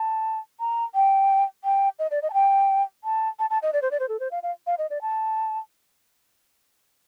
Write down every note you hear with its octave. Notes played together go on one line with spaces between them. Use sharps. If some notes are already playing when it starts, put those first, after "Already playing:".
Already playing: A5
A#5
G5
G5
D#5
D5
D#5
A5
G5
A5
A5
A5
D#5
D5
C5
D5
C5
A4
C5
F5
F5
F5
D#5
D5
A5